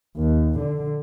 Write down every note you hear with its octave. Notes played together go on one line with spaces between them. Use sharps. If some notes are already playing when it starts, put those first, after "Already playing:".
D#2
D3